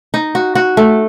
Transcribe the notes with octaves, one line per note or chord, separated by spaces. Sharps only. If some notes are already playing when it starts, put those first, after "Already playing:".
D#4
F#4
F#4
A3